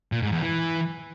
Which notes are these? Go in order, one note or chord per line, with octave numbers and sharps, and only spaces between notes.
A#2
G#2
E2
E3